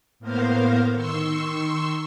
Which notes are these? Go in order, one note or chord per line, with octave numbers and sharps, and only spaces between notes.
A2 A#3 B3 A#4 C5 F5
D#3 C6 C#6 E6